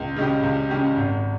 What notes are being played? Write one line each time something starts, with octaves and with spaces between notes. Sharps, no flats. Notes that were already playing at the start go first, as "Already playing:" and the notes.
Already playing: C#2
C#3 G#3 C#4 G4
C#2
C#3 G#3 C#4 G4
G#1